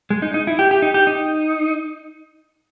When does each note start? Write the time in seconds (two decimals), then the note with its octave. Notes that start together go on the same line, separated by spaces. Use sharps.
0.10 G#3
0.22 D#4
0.34 D#4
0.47 E4
0.59 G4
0.71 G4
0.82 D#4
0.94 G4
1.07 D#4